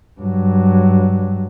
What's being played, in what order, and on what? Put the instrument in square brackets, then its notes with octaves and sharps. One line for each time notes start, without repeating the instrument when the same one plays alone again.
[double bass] G2 F#3